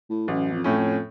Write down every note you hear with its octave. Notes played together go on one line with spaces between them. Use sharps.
A2
A1 F#2
F2
A2 A3 C#4
F2